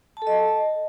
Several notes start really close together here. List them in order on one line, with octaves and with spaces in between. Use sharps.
A5 A4 D#5